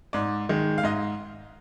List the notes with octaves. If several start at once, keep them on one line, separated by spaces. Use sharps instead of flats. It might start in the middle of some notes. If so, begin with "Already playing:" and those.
G#2 D5
D#3 G#3
F5
G#2 D#5